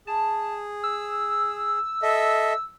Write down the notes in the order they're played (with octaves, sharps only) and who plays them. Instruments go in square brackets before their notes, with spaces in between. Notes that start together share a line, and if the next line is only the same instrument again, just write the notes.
[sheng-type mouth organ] G#4 [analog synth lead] A5
[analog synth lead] E6
[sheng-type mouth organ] A4 D#5 E5